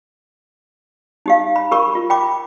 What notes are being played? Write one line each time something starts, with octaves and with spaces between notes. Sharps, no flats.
D#4 G4 F5
B5
G4 A#4 B5 C#6
F4
G5 B5 D6